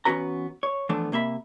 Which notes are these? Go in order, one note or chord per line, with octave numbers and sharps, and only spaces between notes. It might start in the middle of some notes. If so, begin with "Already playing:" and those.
E3 B3 C#4 F#4 B4 A#5
C#5
E3 F3 A3 B3 D4
C3 A#3 E5 B5